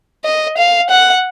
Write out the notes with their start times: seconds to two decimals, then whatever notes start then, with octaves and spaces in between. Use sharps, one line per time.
0.25 D#5
0.58 F5
0.90 F#5